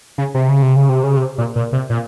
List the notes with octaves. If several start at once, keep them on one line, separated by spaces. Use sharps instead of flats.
C#3
C3
C#3
C3
C#3
C3
C#3
C3
A#2
A#2
C3
A#2